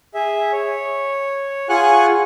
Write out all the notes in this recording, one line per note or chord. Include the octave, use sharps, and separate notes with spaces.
G#4 E5
C#5
F4 G#4 F#5 G#5 C#6 F#6